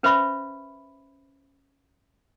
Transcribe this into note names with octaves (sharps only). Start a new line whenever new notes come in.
C#4 B4 C5 E5 B5 C#6